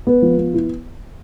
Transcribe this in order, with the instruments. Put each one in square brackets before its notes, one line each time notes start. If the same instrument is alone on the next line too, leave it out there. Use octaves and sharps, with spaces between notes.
[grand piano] B3
F3
B3
E4